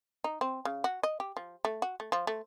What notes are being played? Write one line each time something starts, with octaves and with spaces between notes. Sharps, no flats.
D#4
C4
C#3
F#4
D#5
G4
F3
A3
F#4
A3
F3
A3